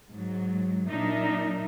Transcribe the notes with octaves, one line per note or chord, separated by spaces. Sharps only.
G#2 F#3
A#2 F#3 D4 D#4 A#4 E5